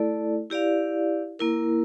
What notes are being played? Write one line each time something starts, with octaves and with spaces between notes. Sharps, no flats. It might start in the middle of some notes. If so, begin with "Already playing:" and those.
Already playing: A3 E4 A4 D5
E4 G4 D5 F5
A#3 E4 A#4